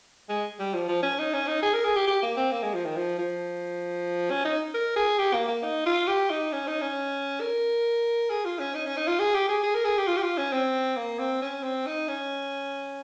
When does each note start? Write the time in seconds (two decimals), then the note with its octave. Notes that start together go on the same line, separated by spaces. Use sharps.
0.29 G#3
0.59 G3
0.74 F3
0.88 F3
1.03 C#4
1.19 D#4
1.33 C#4
1.47 D#4
1.63 G#4
1.74 A#4
1.85 G#4
1.96 G4
2.07 G4
2.22 A#3
2.37 C4
2.52 A#3
2.63 G#3
2.74 F3
2.85 D#3
2.96 F3
3.18 F3
4.30 C#4
4.45 D#4
4.74 A#4
4.96 G#4
5.18 G4
5.34 A#3
5.48 A#3
5.63 D#4
5.86 F4
6.07 G4
6.30 D#4
6.52 C#4
6.68 D#4
6.81 C#4
7.41 A#4
8.30 G#4
8.45 F4
8.59 C#4
8.74 D#4
8.86 C#4
8.97 D#4
9.07 F4
9.20 G#4
9.34 G4
9.49 G#4
9.63 G#4
9.75 A#4
9.85 G#4
9.97 G4
10.07 F4
10.17 G4
10.23 F4
10.38 C#4
10.53 C4
10.97 A#3
11.19 C4
11.42 C#4
11.63 C4
11.86 D#4
12.08 C#4